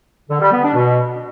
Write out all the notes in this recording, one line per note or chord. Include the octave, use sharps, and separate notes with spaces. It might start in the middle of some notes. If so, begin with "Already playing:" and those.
D3
G3
B3
D4
B2